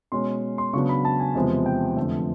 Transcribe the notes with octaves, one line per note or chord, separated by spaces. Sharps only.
B2 G#3 C#4 C6
C6
C#3 F#3 B3 D4 C#6
B5
A5
G#5
E2 C3 F3 G#3 C4
G5
F2 D3 F3 A3